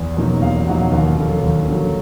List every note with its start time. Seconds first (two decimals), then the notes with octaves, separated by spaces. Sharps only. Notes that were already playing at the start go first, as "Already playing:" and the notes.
Already playing: E2
0.16 B2 F#3 A#3 D#4
0.42 E2 F5
0.67 B2 F#3 A#3 D#4 F#5
0.92 D#2 F5
1.18 D3 F#3
1.43 D#2
1.68 D3 F#3